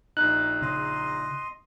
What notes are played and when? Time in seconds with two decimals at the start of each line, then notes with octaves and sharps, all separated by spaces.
0.17 A#1 D#4 F#6
0.62 C#3 D#5 C6